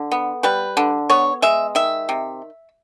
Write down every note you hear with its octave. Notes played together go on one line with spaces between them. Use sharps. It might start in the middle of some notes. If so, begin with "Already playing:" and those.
Already playing: D3
B3
G3 B4
D3
B3 C#5
G#3 E5
D#3 E5
C3